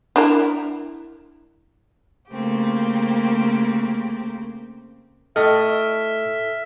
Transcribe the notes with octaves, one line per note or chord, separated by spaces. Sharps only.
D4 E4 A#4
C#3 A3 A#3 C4 G4
A2 A4 D#5 E5 F6